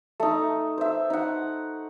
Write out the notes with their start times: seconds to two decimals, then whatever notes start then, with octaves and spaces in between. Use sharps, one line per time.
0.20 A3 D#4
0.78 C5 E5
1.10 D#4 F#5